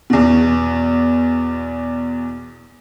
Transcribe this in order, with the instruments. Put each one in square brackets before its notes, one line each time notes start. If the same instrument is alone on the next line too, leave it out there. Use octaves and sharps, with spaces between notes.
[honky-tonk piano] E2 B2